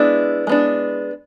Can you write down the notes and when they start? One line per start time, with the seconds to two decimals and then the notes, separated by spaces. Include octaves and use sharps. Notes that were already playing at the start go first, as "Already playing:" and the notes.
Already playing: G#3 B3 D4 E4
0.47 G#3 B3 D4